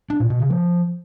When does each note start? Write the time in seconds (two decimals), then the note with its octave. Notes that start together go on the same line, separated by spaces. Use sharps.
0.10 D4
0.20 A#2
0.30 B2
0.40 C#3
0.50 F3